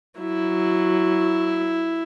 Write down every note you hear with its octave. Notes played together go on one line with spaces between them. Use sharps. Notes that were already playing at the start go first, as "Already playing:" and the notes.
F#3 E4